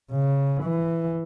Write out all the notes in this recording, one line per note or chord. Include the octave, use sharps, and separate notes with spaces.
C#3
E3